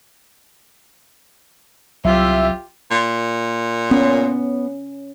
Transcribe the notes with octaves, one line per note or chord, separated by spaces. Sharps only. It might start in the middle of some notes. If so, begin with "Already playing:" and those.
C2 F#3 F4 G4 E5
A#2
B3 C#4